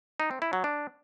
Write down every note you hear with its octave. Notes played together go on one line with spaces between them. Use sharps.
D#4
C4
E4
F#3
D4